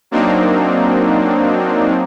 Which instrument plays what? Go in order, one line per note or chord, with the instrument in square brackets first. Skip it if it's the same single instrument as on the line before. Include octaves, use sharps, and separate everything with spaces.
[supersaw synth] F#3 A#3 C4 D4 D#4